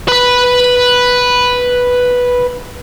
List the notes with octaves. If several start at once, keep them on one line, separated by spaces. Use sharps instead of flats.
B4 B5